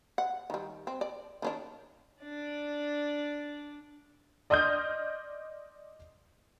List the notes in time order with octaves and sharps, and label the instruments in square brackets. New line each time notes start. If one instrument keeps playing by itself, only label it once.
[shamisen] F#5
D#3 G3
C4
D5
D#3 C#4 D4
[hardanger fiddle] D4 D5
[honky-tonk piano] D5 D#5 C6 D#6 F6 G6